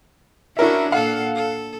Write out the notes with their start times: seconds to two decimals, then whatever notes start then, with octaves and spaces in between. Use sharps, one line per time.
0.57 C#4 D4 E4 F#4 A#4 E5
0.92 A#2 A4 F5 F#5
1.35 A4